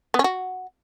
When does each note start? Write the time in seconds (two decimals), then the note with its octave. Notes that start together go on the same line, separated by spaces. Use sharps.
0.14 B3
0.19 C#4
0.24 F#4